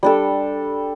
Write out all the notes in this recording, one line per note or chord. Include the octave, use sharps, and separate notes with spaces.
G3 D4 A4